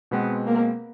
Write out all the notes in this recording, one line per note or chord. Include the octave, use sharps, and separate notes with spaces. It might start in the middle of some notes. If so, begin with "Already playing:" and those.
B2 G#3 B3 C4
A#3